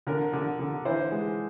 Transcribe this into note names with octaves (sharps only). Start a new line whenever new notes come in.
D3 A#4
D3
D3
E3 C5
G#3